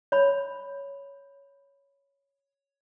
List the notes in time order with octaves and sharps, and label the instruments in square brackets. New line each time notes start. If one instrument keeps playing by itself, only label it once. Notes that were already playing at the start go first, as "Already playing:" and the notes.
[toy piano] C#5 B5